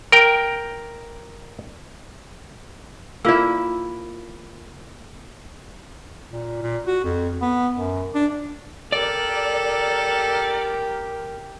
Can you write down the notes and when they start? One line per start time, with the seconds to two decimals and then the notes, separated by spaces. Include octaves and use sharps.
0.12 A#4 G5
3.25 A#3 E4 F4 E6
6.31 A#2
6.62 A#2
6.87 F#4
7.04 F2
7.42 B3
7.74 F#2
8.14 D4
8.92 G4 A4 A#4 D5